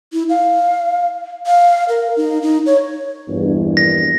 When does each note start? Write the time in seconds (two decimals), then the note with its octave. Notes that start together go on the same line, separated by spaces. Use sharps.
0.13 E4
0.29 F5
1.46 F5
1.89 A#4
2.17 D#4
2.42 D#4
2.66 C#5
3.28 A#1 E2 G2
3.77 A#6